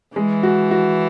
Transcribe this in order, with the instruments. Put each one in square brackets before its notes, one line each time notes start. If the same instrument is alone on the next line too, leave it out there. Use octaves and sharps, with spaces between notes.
[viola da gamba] E3 [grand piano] G#3
[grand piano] F#4
F#4